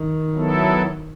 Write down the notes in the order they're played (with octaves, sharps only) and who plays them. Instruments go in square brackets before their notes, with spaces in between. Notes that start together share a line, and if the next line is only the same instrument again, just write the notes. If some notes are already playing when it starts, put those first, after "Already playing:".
Already playing: [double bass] D#3
[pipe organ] F#3 B3 E4 A4